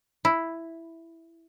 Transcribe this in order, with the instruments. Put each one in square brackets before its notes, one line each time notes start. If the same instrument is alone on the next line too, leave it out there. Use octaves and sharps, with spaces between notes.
[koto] E4